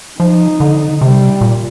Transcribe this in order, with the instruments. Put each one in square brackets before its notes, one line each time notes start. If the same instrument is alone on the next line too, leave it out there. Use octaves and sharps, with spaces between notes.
[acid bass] F3 [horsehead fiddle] D#4
[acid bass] D3
[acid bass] C3 [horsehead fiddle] G3
[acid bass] A#2